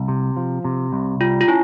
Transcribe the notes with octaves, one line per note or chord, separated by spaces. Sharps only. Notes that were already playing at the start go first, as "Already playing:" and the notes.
Already playing: C2
C3
F3
C3
C2
G3 F4
F4
C#4 E4